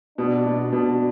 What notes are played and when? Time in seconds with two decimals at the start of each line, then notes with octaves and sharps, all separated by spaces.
0.18 B2 D4
0.45 B2
0.73 B2